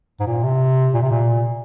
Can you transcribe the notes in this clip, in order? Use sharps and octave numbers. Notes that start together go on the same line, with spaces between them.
G#2
A#2
C3
A#2
C3
A#2